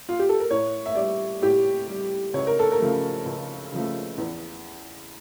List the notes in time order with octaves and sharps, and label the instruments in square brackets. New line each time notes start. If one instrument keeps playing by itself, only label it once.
[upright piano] F4
G4
A4
A#4
A2 C#5
E5
G3 D5
A2 G4
G3
C#2 C#5
A#4
A4
A#4
C#3 F3 A3
C#2
C#3 F3 A3
E2